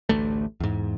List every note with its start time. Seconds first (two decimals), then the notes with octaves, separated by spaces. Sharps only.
0.09 A1 D2 A3
0.60 E2 G#2